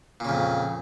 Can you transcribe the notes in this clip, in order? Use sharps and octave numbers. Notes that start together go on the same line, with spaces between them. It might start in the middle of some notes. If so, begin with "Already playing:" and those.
F2 A#2 C#3